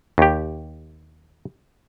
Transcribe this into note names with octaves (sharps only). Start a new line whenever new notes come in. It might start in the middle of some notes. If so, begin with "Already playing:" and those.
D#2 G4